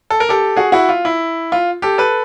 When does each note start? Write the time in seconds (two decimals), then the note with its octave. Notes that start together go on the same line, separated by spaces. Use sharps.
0.10 A4
0.20 A#4
0.29 G4 A4
0.56 F#4 G#4
0.72 E4 F#4
0.89 F4
1.05 E4
1.52 F4
1.82 G4 A4
1.98 A4 B4